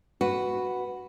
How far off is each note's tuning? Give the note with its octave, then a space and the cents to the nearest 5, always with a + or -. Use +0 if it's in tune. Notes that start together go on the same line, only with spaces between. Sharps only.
F#4 +0 B4 +0